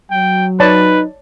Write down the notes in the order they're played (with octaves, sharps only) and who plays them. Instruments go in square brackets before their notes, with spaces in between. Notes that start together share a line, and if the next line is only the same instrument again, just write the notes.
[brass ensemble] F#3 [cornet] G5
[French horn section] D#4 [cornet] B4 [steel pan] C#5 D5 A5